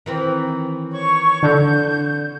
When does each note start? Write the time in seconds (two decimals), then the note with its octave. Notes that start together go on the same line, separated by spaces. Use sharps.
0.06 D#3 E3 C4
0.92 C#5 C#6
1.43 D3 G6